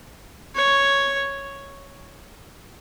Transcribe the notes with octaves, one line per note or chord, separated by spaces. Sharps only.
C#5